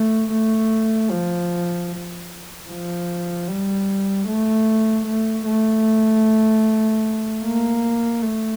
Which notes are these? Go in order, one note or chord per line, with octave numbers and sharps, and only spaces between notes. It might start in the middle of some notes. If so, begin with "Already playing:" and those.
Already playing: A3
A3
F3
F3
G3
A3
A3
A3
A#3
A3